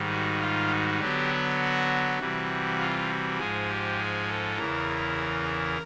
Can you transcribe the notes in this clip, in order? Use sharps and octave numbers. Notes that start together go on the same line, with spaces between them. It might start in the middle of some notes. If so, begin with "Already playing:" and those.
Already playing: G#2 D#3 G3
F#4
F4
F#4
D3 F#3 B3 G4
F#4
C3 E3 G3
F4
F#4
G#2 F3 G#3 G#4
G4
G#4
A4
E2 C#3 E3 A#4